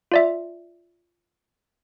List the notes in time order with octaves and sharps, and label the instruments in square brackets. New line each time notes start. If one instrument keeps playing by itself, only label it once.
[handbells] F4 D5 E5